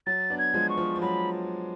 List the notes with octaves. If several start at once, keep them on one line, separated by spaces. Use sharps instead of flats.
F#3 A6
B3 D4
G#6
F3 G#3
C#6
F3
F3
F#3 B5